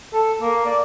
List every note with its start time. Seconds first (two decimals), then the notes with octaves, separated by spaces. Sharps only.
0.13 A4
0.41 A#3
0.66 D5